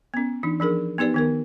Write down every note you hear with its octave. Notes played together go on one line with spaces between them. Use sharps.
B3 C#4
E3 D4 D#4
F3 D4 G#4 A#4
B3 D#4 G4 B4 D5
D#3 B3 A#4